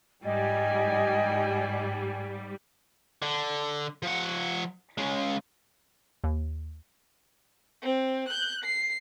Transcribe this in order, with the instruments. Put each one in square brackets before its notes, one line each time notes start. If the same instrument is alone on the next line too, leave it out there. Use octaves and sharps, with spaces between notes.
[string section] G#2 G3 [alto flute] D#5 [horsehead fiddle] G5 G#5
[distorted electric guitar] D3
F3 F#5
C#3 G#3
[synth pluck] D#2
[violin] C4
F#6 G6
C7